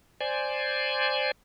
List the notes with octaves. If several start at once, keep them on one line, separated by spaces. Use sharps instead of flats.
C5 D5 G#5